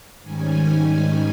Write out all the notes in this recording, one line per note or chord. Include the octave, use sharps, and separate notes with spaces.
G#2 D#3 G3 C#4 G#5